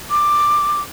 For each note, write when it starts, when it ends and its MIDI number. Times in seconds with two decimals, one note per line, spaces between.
0.10 0.81 86